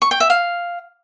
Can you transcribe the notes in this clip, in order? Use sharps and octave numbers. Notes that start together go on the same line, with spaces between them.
C#6
G5
E5
F5